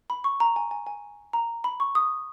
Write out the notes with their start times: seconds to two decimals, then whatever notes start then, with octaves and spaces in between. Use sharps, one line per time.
0.10 B5
0.24 C#6
0.40 A#5
0.56 G#5
0.71 G#5
0.87 G#5
1.33 A#5
1.64 B5
1.80 C#6
1.95 D#6